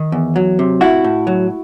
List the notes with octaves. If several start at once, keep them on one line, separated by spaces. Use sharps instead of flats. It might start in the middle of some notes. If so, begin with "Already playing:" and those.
Already playing: D#3
E2
F#3
C3
A2 E4 F#4
A2
F#3